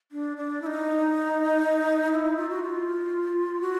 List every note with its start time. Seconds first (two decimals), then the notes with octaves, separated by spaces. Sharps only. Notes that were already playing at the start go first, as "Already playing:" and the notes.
0.12 D4
0.37 D4
0.62 E4
0.66 D#4
2.12 E4
2.37 F4
2.50 F#4
2.63 F4
3.61 F#4